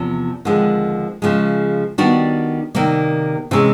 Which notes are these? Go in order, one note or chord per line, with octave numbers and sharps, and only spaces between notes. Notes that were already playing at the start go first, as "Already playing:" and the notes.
Already playing: E2 C3 F3
D#2 D3 F3 G#3 C4
C#3 F3 G#3
D#3 G3 B3 D4 F#4
C3 D#3 G3 A#3
C3 E3 G#3 C#4